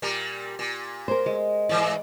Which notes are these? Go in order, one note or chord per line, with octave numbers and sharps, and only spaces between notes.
A#2 G3 A#4
A#2
A#4 C5
G#3
G#2 E3 D5